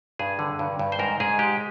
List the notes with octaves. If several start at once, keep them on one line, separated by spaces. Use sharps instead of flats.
G2 G#4
D3
G2
G2
C5
G#2 A#4
G#2 G#4
G#3 G4